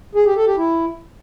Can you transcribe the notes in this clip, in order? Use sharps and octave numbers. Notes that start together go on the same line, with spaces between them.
G#4
G4
A4
G4
E4